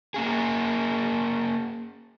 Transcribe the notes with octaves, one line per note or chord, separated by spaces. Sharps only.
A#3 C#4 G#4